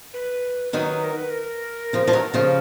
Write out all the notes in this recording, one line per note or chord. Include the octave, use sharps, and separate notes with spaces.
B4
D#3 F#3 B4
A#4
B4
A#4
C#3 F3
F3
D#3 F#3
C#3 F3